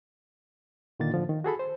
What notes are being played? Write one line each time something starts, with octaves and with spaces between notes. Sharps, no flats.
A#2 D3 D#3 A#3 F4 A6
A2 D3 F3
D#3
F#4 G#4 A4 B5
C5